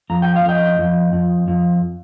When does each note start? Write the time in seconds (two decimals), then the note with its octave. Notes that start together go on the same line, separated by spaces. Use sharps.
0.10 F2 A#5
0.22 G5
0.36 F5
0.44 F2 D#5 G5
0.79 F2
1.13 F2
1.48 F2